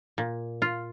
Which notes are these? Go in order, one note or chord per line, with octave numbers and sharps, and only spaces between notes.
A#2
F4